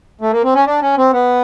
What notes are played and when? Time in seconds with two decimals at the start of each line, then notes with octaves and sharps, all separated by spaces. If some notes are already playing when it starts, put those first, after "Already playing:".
0.21 A3
0.32 A#3
0.44 C4
0.54 C#4
0.66 D4
0.82 C#4
0.98 C4
1.13 B3